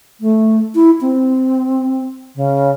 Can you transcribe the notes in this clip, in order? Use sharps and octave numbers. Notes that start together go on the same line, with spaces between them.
A3
E4
C4
C#3